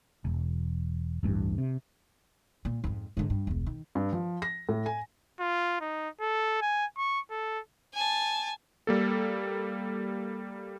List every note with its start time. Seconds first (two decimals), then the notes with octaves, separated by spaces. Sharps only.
0.25 E1
1.23 D1 A1 G2
1.58 C3
2.65 A#2
2.84 F2 G#2
3.17 G#2 D3
3.30 G2
3.47 E1 C#2
3.67 D#3
3.95 G2
4.13 F3
4.42 A#6
4.69 A2
4.86 G#5
5.40 F4
5.81 D#4
6.21 A4
6.62 G#5
6.97 C#6
7.31 A4
7.94 G#5 A5
8.87 G3 A#3 A4